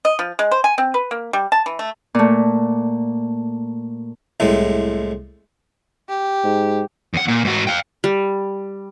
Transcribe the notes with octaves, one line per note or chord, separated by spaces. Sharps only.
D#5
F3
G#3
C5
G#5
C4
B4
A#3
G3
A5
E3
A3
A#2 A3
C2 A2 G#3
G4
G#2
E2 F#5
A#2
G#2 F#4
F5 G5
G3